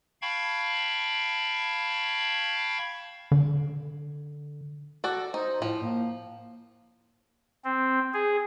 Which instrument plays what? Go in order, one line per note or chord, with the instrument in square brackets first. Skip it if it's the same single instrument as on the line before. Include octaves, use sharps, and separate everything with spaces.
[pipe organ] F5 G5 A5 B5 C#6 G#6
[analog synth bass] D3
[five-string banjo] F#4 A4 D5
[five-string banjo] D#4 [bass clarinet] C5
[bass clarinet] A2 [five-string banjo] F3
[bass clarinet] A#3
[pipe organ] C4
G#4